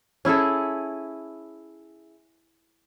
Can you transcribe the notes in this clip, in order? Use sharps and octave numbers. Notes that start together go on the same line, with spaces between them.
C#4 E4 G#4 A4